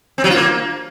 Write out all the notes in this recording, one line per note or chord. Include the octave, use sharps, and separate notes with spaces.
C4
F#3
F4
A#3